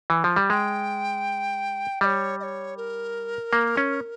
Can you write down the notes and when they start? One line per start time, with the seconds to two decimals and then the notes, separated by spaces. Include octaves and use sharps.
0.10 E3
0.24 F3
0.36 G3
0.50 G#3 G5
2.01 G3 D#5
2.05 C#5
2.40 D#5
2.43 C#5
2.77 A#4
3.53 A#3
3.77 C#4